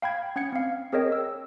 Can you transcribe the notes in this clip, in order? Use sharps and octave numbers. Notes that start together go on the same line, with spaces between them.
F5 G5 B5 G#6
C#4 F#5 G#6 C#7
C4 F5
C4 G#4 A#4 C#5 D#5 G5
E6